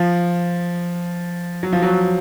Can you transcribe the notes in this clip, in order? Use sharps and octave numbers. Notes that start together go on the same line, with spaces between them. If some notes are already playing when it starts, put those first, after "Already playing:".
Already playing: F3
F#3
F3
F#3